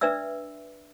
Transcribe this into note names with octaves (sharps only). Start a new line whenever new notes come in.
D4 B4 D5 E5 E6